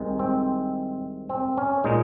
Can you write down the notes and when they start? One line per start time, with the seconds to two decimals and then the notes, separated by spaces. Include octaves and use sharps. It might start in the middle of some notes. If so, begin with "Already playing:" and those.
Already playing: C2 C3 D#3 G#3
0.19 C4
1.29 C4
1.57 C#4
1.84 A#2 G#3 D#4